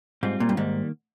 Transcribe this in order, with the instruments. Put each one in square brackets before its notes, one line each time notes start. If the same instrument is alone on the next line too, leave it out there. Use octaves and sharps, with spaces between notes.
[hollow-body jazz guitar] G#2 [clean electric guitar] G3 C4 F4
[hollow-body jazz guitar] A#2
G2
[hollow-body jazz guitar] G#2 [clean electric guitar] D#3 G3 A#3